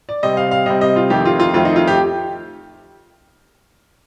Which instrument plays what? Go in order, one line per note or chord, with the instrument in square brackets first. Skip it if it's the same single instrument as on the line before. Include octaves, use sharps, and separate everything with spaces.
[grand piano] D5
C3 G3 C4 D#5
F5
F5
C3 G3 C4 D#5
D#5
F4
F2 D#3 A3 C4 G4
F4
F4
F2 D#3 A3 C4 F4
D#4
F4
G4